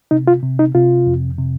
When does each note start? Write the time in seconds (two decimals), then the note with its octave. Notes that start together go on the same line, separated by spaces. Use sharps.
0.11 C3 D#4
0.27 F4
0.43 C3
0.59 D#4
0.75 C3 F4
1.07 F2
1.38 C3